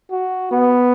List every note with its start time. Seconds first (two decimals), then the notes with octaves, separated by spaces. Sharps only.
0.11 F#4
0.51 B3